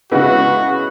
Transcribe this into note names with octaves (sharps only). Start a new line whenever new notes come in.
C#3 G#3 B3 E4 F#4 B4